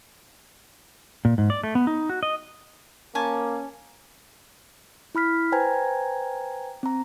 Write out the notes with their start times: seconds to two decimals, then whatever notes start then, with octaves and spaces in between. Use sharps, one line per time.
1.25 A#2
1.38 G#2
1.50 D5
1.64 A3
1.75 B3
1.87 D#4
2.09 F#4
2.23 D#5
3.15 A#3 C#4 G#5 A5
5.15 E4 B5 F6 B6
5.52 B4 C5 G5 G#5 A#5 G#6
6.83 C4 A#5